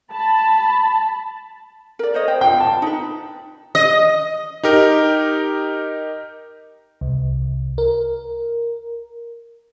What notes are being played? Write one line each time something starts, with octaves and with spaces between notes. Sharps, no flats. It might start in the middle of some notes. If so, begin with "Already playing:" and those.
A5 B5
A#4 D5
C5 C#5 D#5
C5 G5
F4 C5 G5
A5
D#4 B4
D#5
D#4 G4 A#4
C2
A#4